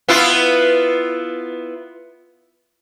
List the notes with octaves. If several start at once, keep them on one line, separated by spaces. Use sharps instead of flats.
B3 E4 F4